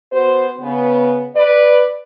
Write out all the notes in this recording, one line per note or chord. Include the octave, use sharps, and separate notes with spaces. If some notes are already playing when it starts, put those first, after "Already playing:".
B3 F#4 C5
C#3 B3
B4 D5